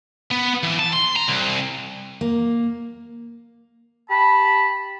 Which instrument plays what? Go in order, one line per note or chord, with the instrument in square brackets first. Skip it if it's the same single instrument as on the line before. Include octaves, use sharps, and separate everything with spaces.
[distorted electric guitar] B3
E3
A5
C6
A#5
C2
[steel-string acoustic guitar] A#3
[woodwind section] G4 A5 B5